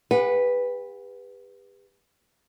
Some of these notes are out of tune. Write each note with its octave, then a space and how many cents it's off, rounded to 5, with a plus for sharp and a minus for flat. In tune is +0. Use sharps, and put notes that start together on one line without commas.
G4 +40 B4 +0 F#5 -25